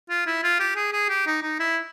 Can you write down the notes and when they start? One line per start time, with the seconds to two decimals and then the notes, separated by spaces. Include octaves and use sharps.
0.10 F4
0.27 E4
0.44 F4
0.60 G4
0.76 G#4
0.93 G#4
1.09 G4
1.27 D#4
1.43 D#4
1.60 E4